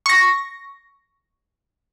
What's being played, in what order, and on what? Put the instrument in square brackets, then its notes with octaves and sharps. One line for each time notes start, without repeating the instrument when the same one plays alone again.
[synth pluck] C#6 A#6